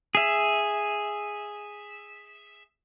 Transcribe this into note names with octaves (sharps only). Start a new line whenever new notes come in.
G#4 E5